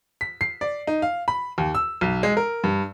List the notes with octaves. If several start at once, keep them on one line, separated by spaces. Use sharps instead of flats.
B6
C7
D5
D#4
F5
B5
D#2
E6
B1
G#3
A#4
G2